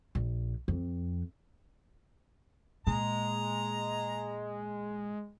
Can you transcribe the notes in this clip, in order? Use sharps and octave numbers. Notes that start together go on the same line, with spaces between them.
A#1
F2
A#2 G#3 A#5